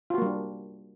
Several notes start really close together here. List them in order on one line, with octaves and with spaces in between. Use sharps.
F4 F#4 A#3 G3 D4